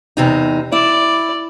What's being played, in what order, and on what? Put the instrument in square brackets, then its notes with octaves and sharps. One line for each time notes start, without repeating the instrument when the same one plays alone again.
[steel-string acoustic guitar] E2 C3 D#4
[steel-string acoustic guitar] E4 [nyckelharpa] D5